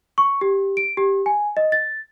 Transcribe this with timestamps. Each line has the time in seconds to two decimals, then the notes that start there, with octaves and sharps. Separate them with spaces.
0.18 C#6
0.41 G4
0.77 D7
0.97 G4
1.26 G#5
1.57 D#5
1.72 A6